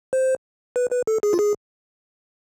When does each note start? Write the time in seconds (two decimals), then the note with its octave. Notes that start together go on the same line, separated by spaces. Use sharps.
0.13 C5
0.76 B4
0.91 B4
1.07 A4
1.23 G#4
1.33 F4
1.39 G#4